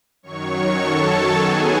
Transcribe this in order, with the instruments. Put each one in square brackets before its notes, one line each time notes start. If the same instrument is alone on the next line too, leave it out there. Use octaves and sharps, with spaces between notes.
[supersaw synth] F#2 D#3 F#3 C#5 C#6
A4 A5
D#3 F#3 B3 G#4 G#5